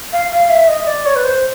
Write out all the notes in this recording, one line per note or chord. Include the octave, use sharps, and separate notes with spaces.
F5
F5
E5
D#5
D5
C#5
B4
C5